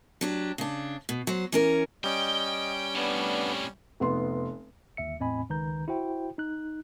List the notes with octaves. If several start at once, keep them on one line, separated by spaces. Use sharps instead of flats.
F#3 D4 G4
C#3 D4
B2
F#3 C5
E3 C#4 A#4
G3 C#4 D#5 G5
C2 A2 B3 D4
F1 B3 C6
G1 D#2 E5 C#7
E2 A2 C4 D#5 G#5 B5
C#2 D#3 B4 A#5 G6
E4 F#4 C5 G5
D#4 F#6